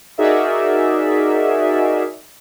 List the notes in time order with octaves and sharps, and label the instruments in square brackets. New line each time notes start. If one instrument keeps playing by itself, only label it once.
[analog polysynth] D#4 F#4 G#4 A#4 D5 E5